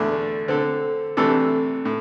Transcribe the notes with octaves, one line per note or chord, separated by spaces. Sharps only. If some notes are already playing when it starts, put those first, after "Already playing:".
Already playing: E2 D3 A3 D4
D3 C4 A4
C3 E3 A3 D4 A4
A2